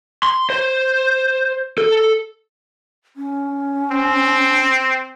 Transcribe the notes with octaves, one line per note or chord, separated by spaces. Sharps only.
C6
C5
A4
C#4
C4